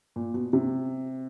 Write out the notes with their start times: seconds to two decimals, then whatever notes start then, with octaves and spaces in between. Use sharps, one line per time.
0.16 A#2
0.34 B2
0.53 C3